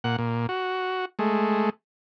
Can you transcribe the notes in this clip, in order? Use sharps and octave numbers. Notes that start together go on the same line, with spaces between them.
A#2 F#5
A#2
F#4
G#3 A3